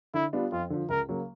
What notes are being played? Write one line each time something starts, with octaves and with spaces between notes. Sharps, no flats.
D3 E4
G3 B3 D4 F4
F2 F4
D3 F3
C#2 A#4
C#3 F#3 A#3